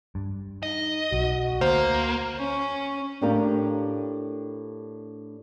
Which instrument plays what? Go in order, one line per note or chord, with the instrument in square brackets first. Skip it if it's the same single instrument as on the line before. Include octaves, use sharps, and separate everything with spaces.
[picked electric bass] G2
[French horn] D#4 [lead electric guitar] D#5
[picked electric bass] B1 [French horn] F#4
[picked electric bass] D2 [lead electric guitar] A#3 [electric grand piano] C5
[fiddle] C#4
[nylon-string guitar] A2 D4 G4 A#4 F5